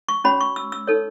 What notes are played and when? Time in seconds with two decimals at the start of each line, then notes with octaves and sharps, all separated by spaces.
0.09 C#6
0.24 C#4 F#4 C#5 B5
0.41 C#6
0.56 E6
0.72 E6
0.87 D#4 A4 C#5